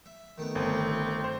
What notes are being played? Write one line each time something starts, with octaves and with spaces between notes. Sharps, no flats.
E5
D#3 A3 B3
G1 C4
C5